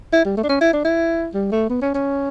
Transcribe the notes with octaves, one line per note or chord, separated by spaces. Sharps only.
E4
G3
A3
D4
C#4
E4
D4
E4
G3
A3
B3
C#4
C#4